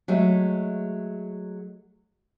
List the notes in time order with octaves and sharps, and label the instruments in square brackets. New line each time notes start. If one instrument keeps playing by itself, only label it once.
[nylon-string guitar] F#3 G#3 A3